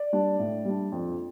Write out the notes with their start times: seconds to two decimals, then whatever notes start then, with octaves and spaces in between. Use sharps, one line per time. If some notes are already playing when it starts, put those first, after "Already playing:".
Already playing: D5
0.13 G3 D4
0.39 A2
0.65 G3 D4
0.92 F2